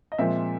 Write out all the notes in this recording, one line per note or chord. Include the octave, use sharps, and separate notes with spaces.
D#5
A#2 F3 G#3 C4 E5